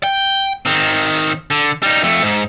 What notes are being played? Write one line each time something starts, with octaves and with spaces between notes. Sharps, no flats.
G5
D#3 C4
D3
G3 D#4
F2 A3
G#2